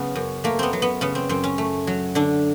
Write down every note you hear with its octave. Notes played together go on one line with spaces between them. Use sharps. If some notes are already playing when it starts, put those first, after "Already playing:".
Already playing: C#3 F#3 B3
F#2
A3 A#3
B3 C4
F#3
B3
C#3 B3
C4
F#2 C4
C#4
A3
F#3
D3 D4